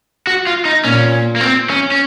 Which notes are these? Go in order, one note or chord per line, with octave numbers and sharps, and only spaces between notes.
F#4
F4
D#4
A#2 C#4
A#3
C4
C#4
C#4